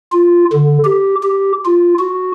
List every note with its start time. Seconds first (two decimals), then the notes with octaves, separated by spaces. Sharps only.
0.12 F4
0.53 D3
0.85 G4
1.23 G4
1.66 F4
1.99 F#4